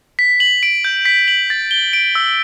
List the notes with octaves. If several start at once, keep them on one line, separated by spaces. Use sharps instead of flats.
B6
F#7
D7
G6
B6
F#7
A6
G7
D7
E6